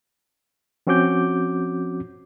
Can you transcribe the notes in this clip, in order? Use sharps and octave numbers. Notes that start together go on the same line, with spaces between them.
F3 C4 C#4 F#4 D6 G6